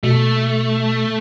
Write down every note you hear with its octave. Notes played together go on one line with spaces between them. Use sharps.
B2 A3